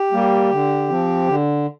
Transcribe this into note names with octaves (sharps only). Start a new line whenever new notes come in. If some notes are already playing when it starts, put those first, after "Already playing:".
Already playing: G4
G3 A#3
D3
F3 C4
D3